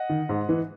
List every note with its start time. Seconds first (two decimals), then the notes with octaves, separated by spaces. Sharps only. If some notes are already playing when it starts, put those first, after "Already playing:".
Already playing: D#5 F#5
0.09 D#3
0.29 G#2
0.49 E3